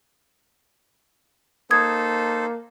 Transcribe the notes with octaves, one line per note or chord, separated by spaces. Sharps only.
A#3 D#4 A4 C5 D#6 G#6